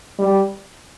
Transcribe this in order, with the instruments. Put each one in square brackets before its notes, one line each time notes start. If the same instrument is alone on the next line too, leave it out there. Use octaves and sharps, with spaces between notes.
[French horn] G3